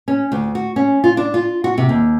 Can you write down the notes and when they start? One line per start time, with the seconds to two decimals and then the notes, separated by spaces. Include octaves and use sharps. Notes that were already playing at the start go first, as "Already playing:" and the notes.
0.08 C#4
0.32 D2
0.55 F#4
0.76 C#4
1.04 F4
1.17 D4
1.34 F4
1.64 F#4
1.78 C3
1.89 D#2